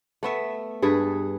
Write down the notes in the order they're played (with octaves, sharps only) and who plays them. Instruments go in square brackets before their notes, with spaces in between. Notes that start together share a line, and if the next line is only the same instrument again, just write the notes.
[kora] A3 B3 E5
G2 G#4 A4 B4